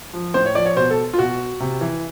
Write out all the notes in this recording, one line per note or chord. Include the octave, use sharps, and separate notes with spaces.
F3
A2 C5
C#5
F3 D5
C#5
B2 C5
A4
F4
B2 F#4
C3
E3